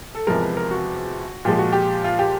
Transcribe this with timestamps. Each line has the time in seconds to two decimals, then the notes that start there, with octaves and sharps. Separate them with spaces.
0.15 A4
0.27 E2 C3 F3 G#3 A#4
0.42 B4
0.57 A#4
0.71 F#4
1.45 A#2 F3 G#3 G4
1.59 F#4
1.72 G4
2.04 F4
2.19 G4